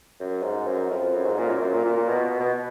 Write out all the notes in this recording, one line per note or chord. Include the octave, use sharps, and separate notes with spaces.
F#2
G#2
F#2
F2
F#2
G#2
A#2
F#2
F#2
A#2
A#2
A#2
B2
B2
B2